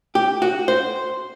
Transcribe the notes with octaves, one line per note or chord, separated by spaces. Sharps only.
G4
F#4
C5